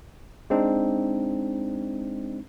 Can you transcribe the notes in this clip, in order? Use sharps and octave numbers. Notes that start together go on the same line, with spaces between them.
G#3 C4 D4 D#4